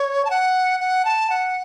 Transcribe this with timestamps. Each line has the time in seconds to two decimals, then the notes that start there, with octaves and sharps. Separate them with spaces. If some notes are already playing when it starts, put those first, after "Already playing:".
Already playing: C#5
0.25 A5
0.30 F#5
0.80 F#5
1.05 A5
1.30 F#5